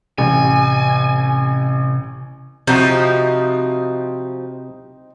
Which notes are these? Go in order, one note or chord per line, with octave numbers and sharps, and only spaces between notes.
A1 C3 G#5
C3 F3 C4 D#4 E4 F#4 G6